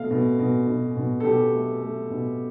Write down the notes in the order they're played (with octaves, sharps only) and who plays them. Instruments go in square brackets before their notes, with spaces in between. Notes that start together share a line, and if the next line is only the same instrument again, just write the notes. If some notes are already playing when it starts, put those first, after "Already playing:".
Already playing: [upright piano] B2 A3 F5
B2
B2
B2
B2
A4
B2 G4
A3
A3
B2